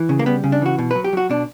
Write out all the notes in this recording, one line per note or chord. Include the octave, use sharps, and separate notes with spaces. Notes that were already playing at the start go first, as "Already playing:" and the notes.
Already playing: E3
C#3
A#3
G3 B3
C#3
D4
E3 F#4
B2
B4
F#3
G4
F#3 F#4
B2 D4